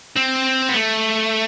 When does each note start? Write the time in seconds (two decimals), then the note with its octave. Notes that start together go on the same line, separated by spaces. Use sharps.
0.17 C4
0.69 B3
0.75 A3